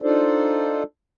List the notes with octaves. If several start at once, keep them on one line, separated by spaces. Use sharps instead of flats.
D4 D#4 F4 A4 C5 D5